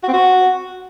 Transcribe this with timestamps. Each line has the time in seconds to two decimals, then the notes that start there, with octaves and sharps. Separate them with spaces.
0.03 F#4
0.08 C4
0.13 F#4